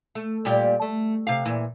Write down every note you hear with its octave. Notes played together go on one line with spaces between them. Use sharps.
A3
A#2 G3 G4
A3
C3 F5
A#2 E3